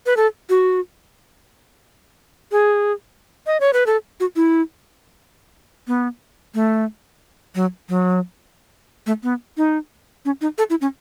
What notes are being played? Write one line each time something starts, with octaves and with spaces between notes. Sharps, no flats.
B4
A4
F#4
G#4
D#5
C#5
B4
A4
F#4
E4
B3
A3
F#3
F#3
A3
B3
D#4
C#4
D#4
A4
E4
C#4